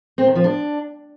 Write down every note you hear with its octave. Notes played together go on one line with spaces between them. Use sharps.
C4
D#3
F3
D4